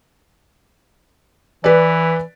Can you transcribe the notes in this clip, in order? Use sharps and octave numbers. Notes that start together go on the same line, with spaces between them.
E3 B4 D5